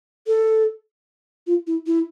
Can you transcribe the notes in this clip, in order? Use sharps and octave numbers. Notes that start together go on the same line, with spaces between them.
A4
F4
E4
E4